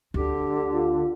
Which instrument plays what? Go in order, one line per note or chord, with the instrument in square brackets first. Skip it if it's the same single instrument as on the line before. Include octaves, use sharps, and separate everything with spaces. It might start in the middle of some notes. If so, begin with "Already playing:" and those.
[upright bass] D2 [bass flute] D3 [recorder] G4
[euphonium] F4